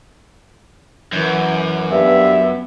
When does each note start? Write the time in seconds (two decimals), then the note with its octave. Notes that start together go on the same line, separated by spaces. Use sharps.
1.12 F#2 E3
1.92 G2 B3 E5